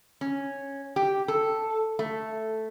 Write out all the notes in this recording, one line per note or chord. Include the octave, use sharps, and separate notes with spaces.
C#4
G4
A4
A3